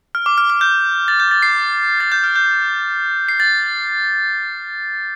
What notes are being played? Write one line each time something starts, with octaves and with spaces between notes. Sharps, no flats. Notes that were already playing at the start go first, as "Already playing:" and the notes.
F6
D6
F6
F6
G6
A6
G6
A6
C7
A6
G6
F6
G6
C7
A6